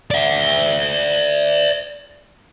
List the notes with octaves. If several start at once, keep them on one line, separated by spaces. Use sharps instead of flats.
D5 E5